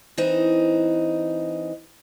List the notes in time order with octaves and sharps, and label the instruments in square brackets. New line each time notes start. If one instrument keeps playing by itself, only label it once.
[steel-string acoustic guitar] E3 C4 D#4